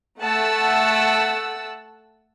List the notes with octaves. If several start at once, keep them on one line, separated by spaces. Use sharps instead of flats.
A3 F#5 A5 E6